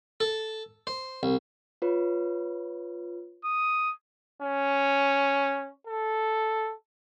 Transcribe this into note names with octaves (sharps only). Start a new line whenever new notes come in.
A4
C5
C2
F4 B4 C#5
D#6
C#4
A4